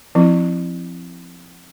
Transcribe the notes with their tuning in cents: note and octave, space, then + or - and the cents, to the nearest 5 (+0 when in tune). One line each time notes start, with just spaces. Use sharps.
F3 +0 C4 +0 E4 +0